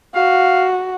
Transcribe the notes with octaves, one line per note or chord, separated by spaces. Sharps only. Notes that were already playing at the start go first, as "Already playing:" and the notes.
F#4 F5